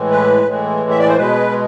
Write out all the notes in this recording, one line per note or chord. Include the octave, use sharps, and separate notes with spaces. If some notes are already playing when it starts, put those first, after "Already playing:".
Already playing: A2 E3 G#3
B4
A2 E3 G#3
E5
D5
C5
B2 G#3 B4